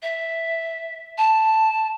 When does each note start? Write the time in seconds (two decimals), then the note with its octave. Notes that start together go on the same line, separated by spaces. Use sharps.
0.02 E5
1.18 A5